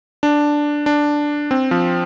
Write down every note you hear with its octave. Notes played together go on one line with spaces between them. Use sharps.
D4
D4
C4
F3